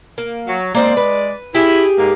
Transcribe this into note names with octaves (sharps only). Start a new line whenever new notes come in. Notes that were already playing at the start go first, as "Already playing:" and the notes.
A#3
F#3
G#3 A#3 C4 C5 D5
B4
E4 G4 G#4
G#2 A#3